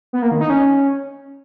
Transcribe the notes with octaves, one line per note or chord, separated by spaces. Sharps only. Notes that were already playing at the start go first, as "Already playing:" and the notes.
B3
A#3
D#3
D#4
C#4